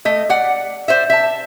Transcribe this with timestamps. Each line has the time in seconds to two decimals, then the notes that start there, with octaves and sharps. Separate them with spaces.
0.05 A3 D#5
0.29 D5 F#5
0.88 C5 D5 E5
1.10 E5 A5